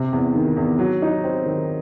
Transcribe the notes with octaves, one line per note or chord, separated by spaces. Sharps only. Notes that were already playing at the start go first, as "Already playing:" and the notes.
Already playing: C3
E2
D#3
E2
F#3
D#4
C4
D#3